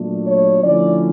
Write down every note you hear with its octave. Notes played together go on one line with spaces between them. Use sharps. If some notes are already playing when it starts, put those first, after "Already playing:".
Already playing: A#2 F#3 A3 D4
C#5
D3 F3 A3 C#4 E4 D5